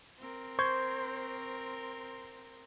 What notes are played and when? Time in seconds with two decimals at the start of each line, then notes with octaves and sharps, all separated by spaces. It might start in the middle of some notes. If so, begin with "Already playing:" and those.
0.19 C4 A#4
0.59 C5 C#6 G6 G#6